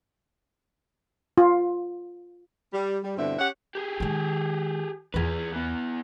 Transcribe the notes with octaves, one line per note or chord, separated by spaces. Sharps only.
F4
G3
G3
G2 B2 D3 C4 E4 E5
C#4 G4 C#5 F#5
G4 G#4
D#3 G#3
E2 F4 G#4 B4
E3 B3